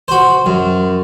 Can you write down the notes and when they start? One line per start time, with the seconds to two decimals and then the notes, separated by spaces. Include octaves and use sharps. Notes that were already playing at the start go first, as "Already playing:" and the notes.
0.08 F#4 C5
0.46 F#2